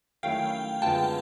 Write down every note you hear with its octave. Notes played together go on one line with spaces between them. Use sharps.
D#3 F#3 A3 C#4 E4 F5 G5
F#2 D3 F3 G#3 B3 G5 A5